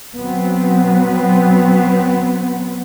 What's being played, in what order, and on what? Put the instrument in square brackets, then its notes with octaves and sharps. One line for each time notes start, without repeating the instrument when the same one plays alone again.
[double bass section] F#3 B3 C4